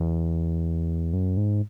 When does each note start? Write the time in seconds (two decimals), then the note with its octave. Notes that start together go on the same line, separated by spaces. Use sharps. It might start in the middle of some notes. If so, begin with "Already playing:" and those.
Already playing: E2
1.13 F#2
1.37 G#2